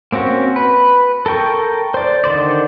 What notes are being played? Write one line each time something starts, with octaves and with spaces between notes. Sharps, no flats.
A#3 C4 C#4 F#4
B4
A4 A#4 G5 C#6
C5 D5
D3 D#3 C5 D5